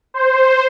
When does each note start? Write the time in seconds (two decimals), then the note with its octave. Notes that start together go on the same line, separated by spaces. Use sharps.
0.14 C5